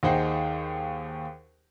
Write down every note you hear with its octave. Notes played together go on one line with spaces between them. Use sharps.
D#2 D#4 G#4 C5 F#5 G5